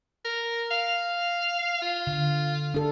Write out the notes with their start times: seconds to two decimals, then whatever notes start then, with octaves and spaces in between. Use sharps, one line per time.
0.25 A#4
0.71 F5
1.82 F4
2.07 D3
2.74 D4 A4